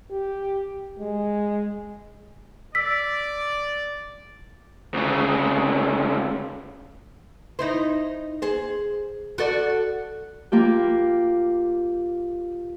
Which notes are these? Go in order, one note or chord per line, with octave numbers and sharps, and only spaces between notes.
G4
G#3
D5 E6 B6
D2 C#3
D#4 E4 C5
G#4 C5
F#4 A4 D5
A#3 F4 G4